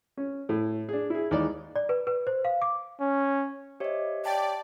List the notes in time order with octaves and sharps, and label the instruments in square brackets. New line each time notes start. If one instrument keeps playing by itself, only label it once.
[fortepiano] C#4
A2
D4 G#4
E4 G#4
D#2 E3 G#3 D5
[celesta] D5
B4
B4
C5
F5
D6
[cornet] C#4
[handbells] G4 C#5 E5 [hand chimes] C5 D#5
[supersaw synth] D5 [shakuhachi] G5 [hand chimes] A5